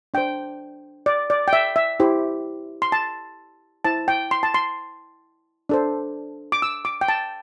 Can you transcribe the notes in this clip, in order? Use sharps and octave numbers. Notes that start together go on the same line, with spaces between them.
D4 C5 G5
D5
D5
G5
E5
E5
E4 G4 C5
C6
A5
E4 C5 A5
G5
C6
A5
C6
D4 A4 C5
D6
E6
D6
G5
A5